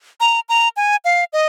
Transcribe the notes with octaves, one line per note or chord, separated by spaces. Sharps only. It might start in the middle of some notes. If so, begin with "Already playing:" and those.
A#5
A#5
G#5
F5
D#5